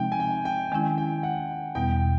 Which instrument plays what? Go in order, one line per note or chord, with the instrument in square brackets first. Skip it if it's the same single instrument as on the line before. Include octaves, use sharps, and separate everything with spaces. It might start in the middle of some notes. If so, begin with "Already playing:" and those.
Already playing: [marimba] C3 F3 G#3 C4 D#4 [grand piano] G5
[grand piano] G#5
G5
G5
[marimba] D#3 G#3 C#4 E4 [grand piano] G#5
[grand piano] G5
F#5
[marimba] E2 B2 G3 B3 [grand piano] G5